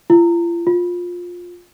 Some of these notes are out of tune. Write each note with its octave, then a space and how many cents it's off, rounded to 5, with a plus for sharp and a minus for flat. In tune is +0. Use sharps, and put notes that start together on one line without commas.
F4 -40
F4 +15